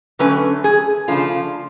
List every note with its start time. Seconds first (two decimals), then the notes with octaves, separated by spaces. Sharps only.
0.19 D3 F#3 A3 C#4 B4
0.64 G#4
1.08 C#3 F3 A3 D4 F4